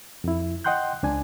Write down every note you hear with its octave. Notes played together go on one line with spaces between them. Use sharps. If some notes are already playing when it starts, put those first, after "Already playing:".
F2 E4
D#5 F#5 G5 C6 F#6 G6
C#2 D4 G#5